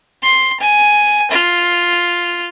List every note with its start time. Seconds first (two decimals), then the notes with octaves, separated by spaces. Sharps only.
0.23 C6
0.60 G#5
1.31 F4